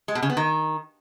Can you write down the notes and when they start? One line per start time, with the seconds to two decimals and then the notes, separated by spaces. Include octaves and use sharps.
0.08 G#3
0.15 B2
0.22 C#3
0.30 B3
0.37 D#3